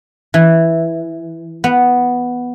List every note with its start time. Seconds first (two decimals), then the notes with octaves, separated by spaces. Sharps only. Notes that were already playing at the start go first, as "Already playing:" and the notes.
0.34 E3
1.64 B3